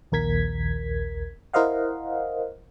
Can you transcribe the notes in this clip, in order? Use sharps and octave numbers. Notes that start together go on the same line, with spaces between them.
A#1 D#2 A#4 G#6 B6
E4 A#4 C5 D#5 F5 F#5